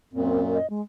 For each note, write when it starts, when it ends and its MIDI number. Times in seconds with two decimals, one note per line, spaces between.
0.13 0.58 42
0.13 0.58 46
0.13 0.41 60
0.54 0.69 75
0.70 0.82 56